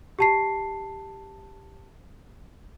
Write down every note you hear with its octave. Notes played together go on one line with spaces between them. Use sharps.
G4 A5 C7